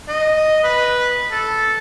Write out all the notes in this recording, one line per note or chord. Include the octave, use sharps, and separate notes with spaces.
D#5
B4
A4